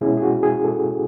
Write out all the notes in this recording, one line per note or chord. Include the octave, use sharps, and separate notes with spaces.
B2 G#3 C#4 E4 G#4
G#4
F#4
G#4
A4